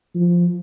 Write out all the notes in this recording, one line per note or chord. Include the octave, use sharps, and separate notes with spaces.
F3